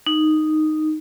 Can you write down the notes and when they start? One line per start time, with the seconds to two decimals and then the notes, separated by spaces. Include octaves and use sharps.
0.07 D#4